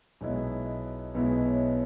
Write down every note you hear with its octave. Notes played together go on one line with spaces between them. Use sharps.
B1 B2 G#3 B3 E4 C#5
B1 B2 G#3 B3 E4 B4
C#5